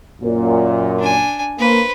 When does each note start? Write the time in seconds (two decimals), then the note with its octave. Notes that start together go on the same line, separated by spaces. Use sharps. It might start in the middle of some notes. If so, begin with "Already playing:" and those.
0.22 F#2 A#2
0.99 D4 G#5
1.59 A#3 B4 C5